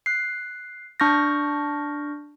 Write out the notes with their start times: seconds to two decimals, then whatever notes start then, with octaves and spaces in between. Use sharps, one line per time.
0.06 F#6 C7
1.00 D4 C#6 F6 G6 A#6